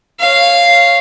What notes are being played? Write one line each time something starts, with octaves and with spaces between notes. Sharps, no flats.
C#5 F5